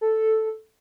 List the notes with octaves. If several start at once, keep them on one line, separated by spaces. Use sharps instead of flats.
A4